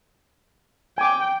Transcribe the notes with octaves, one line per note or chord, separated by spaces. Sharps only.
G5 G#5 D6